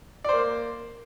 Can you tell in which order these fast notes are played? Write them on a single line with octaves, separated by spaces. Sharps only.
D5 C5 A#3